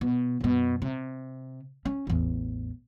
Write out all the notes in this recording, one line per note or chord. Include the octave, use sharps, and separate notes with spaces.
B2
F#2 B2
C3
C#4
A1 E2